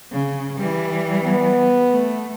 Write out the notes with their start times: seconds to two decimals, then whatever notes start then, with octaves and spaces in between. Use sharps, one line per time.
0.12 C#3
0.57 E3 G3
1.23 B3
1.91 A3